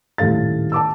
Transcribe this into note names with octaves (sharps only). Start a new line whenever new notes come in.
D#1 A2 A4 F5 A6
A5 D6 E6